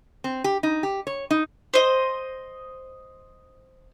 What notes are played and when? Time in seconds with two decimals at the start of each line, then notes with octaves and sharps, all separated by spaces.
0.24 C4
0.44 G4
0.63 D#4
0.83 G4
1.07 C#5
1.31 D#4
1.74 C5 D#5